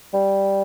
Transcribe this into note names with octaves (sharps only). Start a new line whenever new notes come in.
G3